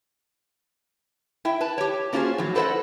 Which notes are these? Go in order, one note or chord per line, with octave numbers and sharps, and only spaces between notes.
E4 E5 G5
B4 A5
G4 C#5
A#3 C#4 F4 F#4 G#4 C5
A2 F3 F#3
E4 A4 B4 C5 D#5 F#5